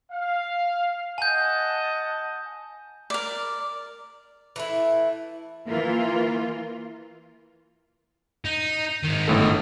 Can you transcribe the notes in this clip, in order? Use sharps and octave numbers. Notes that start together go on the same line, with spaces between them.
F5
D#5 F#5 G#5 A5 G6
A#4 D5
E3 A3 E4
E3 A#3 F4
D#4
G#2 D#3
G1 A2 A4